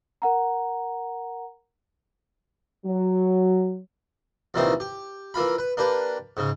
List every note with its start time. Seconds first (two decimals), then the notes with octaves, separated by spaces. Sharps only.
0.22 A#4 F#5 A#5
2.86 F#3
4.54 C2 A#2 D#3 E3 D#4 C5
4.80 G4
5.34 E3 A#3 F4 B5
5.58 B4
5.77 A#3 D4 G4 B4
6.37 G#2 C#3